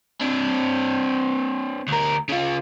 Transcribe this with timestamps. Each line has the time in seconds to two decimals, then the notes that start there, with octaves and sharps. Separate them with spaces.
0.21 C4 D4
1.88 D2 A#4
2.29 C#3 F4